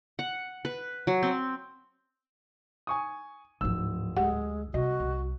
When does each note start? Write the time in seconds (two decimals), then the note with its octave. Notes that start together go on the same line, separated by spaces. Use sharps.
0.19 F#5
0.65 B4
1.07 F#3
1.23 C4
2.87 G#5 C#6 D#6
3.61 D1 G#2 F3 E6
4.17 D2 G#3 G4 F#5
4.74 C3 G3 F#4 D#5
5.00 C2